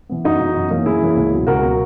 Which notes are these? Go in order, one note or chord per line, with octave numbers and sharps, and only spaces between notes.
E3 B3
F#2 D#4 F#4
E3 B3
F#2
E3 A#3 C#4
F#2 E4 G#4
E3 A#3 C#4
C#2
B2 F#3
C#2 F#4 A#4
B2 F#3